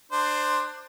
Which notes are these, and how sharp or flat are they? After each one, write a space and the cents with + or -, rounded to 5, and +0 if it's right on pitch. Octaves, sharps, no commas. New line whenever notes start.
D4 +25 C5 +0